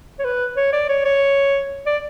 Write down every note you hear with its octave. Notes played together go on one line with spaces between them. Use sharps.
C#5
B4
C#5
D5
C#5
C#5
D5